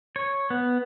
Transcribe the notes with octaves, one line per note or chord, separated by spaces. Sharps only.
C#5
B3